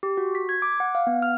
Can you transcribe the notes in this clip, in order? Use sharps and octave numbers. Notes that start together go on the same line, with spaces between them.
G4
F#4
B6
G#6
D6
F#5
F5
B3
F6